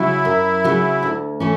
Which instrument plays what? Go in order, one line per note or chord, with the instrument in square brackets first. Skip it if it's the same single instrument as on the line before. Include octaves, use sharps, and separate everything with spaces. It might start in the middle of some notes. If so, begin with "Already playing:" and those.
Already playing: [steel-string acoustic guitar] C#3 F#3 [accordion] E4
[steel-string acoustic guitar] F#2
C#3 F#3
D2
E3 A3 C#4